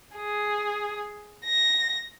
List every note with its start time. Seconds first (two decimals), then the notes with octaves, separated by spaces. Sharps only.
0.16 G#4
1.45 A#6